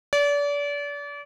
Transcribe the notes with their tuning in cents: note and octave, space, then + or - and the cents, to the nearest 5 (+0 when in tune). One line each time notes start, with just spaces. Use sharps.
D5 -35